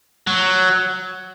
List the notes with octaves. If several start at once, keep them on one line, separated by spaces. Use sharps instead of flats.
F#3